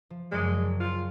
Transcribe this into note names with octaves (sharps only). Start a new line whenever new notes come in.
F3
F#1 F#2 G#3 D5
F4